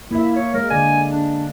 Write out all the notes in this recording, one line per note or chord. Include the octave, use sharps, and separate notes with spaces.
A#3 E4 E5
C#5
G#3 A#4
D3 D5 G#5
D4